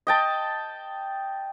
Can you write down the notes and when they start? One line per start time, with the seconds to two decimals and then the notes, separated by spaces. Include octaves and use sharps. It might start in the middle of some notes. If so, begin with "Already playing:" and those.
0.07 D#5 G5 A5